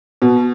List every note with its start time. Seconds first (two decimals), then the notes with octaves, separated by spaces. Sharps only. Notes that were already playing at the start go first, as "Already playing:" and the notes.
0.22 B2